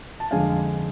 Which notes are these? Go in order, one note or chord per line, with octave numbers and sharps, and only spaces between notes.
A5
F2 D3 G#3 D4 F5 G#5